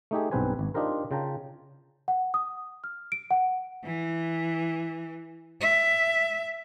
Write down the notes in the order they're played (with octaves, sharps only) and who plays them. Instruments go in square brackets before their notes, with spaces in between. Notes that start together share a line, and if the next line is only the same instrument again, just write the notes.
[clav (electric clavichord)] A3 D#4 G4 G#4
B1 G2 C4 B4 C5 G#5
G#1
D4 D#4 F4 G4 A#4 C5
C#3 F4 G5 A5 A#5
[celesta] F#5
D#6
F6
D7
F#5
[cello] E3
E5